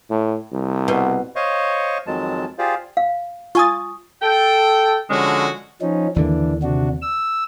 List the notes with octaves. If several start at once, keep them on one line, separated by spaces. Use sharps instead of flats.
A2
C2
B2
C5 C#5 D#5 F5 C#6
F2 D#3 F#3 G#3 A5
F4 G4 G#4 C5 D5 F5
F5
F4 G#5 C#6 D#6 A6
A4 G5
D3 F3 G#3 C#4 F#4
F3 C#4 D#4
D#2 D3 E3 A#3 D4
C3 D4 F#4
E6